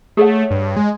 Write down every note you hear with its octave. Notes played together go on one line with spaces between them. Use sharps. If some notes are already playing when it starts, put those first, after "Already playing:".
A3 G#4 C#5 F#5
G2
G#3